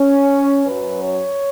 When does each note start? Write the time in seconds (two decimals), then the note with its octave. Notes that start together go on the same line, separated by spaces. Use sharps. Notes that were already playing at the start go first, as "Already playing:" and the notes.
Already playing: C#4
0.67 F#2 F#3 C#4 B4
1.05 C#5